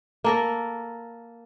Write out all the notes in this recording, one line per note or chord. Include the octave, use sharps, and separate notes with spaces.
A#3 A4 A#4